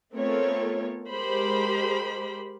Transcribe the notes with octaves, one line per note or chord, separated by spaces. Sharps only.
A3 B3 C4 F4 A#4 C#5
G#3 G4 A#4 C5 B5